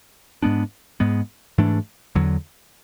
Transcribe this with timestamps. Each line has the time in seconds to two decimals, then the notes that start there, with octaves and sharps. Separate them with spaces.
0.43 G#2 G#3 B3 D4
1.00 G#2 G#3 B3
1.58 G#2 E3 A3 D4
2.15 E2 D3 F#3